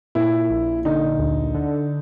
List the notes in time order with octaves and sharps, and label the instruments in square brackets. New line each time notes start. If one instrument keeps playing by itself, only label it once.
[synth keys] A#2 [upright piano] E4
[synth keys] A#1
[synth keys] D3 [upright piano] D#4
[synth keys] D2
D3